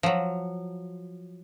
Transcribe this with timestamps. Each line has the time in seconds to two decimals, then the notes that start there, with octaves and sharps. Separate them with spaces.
0.03 F3 F#3